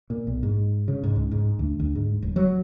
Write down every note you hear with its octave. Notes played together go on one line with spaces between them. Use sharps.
A#2
B1
G#2
C#3
G#2
C#2
G#2
D2
D2
G#2
D1
F#3